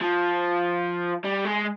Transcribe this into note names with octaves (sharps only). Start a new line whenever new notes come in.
F3
G3
G#3